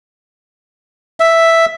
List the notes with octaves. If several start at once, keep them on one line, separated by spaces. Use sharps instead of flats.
E5